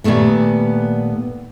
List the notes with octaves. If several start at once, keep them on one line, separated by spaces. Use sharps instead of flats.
A#2 D#3 G3 A3 B3